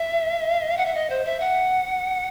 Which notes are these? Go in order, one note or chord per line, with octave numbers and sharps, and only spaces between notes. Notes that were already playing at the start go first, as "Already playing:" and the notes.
Already playing: E5
F#5
E5
D#5
C5
E5
F#5